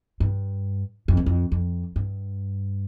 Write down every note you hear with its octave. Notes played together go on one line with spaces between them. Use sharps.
G2
F2
G2
F2
F2
G2